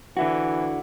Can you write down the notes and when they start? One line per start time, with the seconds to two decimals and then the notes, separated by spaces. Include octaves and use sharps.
0.17 D3 E3 E4 F#4